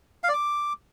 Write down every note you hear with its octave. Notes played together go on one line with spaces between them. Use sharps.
F5
D5
D6